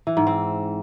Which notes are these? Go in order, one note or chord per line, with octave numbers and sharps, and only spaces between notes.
E3
G#2
C4